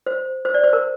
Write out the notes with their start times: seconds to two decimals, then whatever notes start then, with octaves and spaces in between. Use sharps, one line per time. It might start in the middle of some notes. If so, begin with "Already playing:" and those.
0.06 C5
0.45 C5
0.54 D5
0.64 C5
0.73 A#4